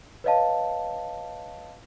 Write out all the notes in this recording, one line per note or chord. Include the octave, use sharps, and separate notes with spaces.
B4 C#5 D#5 F5 A5